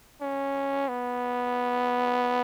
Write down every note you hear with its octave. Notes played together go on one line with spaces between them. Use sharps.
C#4
B3